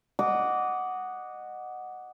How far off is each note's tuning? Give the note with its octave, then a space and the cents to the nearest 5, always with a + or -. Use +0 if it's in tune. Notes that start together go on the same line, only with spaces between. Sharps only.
D#5 -20 F#5 +0 D6 -20